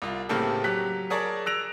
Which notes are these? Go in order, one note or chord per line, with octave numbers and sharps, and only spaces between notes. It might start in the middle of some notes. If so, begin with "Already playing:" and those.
C2 F4
A2 C#3 A#3 C4 G4 A4
F#3 G4 F#6 B6
G#4 A#4 C#5 D5 A5
E6 F#6 A#6 D7 F7